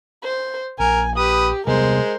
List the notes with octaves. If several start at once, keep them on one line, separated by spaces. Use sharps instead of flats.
C5
A#1 A#4 G#5
G4 B4 D#6
C3 G3 G#3 B3 A#4 C5